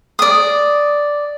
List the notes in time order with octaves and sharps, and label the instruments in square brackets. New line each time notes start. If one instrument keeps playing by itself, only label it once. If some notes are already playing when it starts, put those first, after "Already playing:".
[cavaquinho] D5 D#6